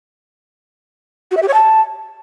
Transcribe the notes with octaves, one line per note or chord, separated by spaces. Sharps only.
F#4
E5
G4
C#5
A5